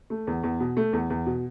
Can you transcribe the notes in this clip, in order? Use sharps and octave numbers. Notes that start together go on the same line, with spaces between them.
A3
E2
E2
B2
A3
E2
E2
B2